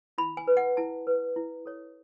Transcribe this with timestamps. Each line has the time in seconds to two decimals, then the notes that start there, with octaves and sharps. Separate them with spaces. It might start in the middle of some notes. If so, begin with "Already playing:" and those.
0.18 E4 B5
0.37 G#5
0.47 B4
0.57 F#5
0.77 E4 A5
1.07 B4
1.36 E4
1.66 A4 C#5